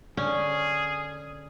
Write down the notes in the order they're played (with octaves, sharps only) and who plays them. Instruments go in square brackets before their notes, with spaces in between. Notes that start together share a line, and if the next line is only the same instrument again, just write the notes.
[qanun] D3 [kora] C#4 [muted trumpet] G#4